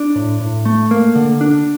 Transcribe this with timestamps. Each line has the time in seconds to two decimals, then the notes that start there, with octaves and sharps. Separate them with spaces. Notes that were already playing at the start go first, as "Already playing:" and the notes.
Already playing: D4
0.16 A2
0.41 A2
0.66 A3
0.91 A#3
1.15 D3
1.41 D4